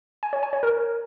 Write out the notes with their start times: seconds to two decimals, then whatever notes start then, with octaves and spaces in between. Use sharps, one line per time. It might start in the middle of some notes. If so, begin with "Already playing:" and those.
0.23 G#5
0.33 C#5
0.43 G#5
0.53 C#5
0.63 A#4